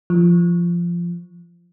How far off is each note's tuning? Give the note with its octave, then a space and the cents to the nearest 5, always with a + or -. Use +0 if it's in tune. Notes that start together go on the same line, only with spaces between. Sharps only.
F3 -15